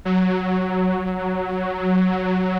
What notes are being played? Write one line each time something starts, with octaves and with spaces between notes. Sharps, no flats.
F#3